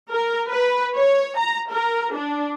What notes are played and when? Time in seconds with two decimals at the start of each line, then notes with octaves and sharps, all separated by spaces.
0.12 A#4
0.49 B4
0.96 C#5
1.37 A#5
1.70 A#4
2.14 D4